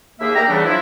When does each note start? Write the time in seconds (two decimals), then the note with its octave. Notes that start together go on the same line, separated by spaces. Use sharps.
0.20 D#2 A#3 G#4 E5
0.35 G4 A#4 D5 A#5
0.48 C#3 E3 G3 A3 B3 D4
0.65 F3 F#3 D4 E4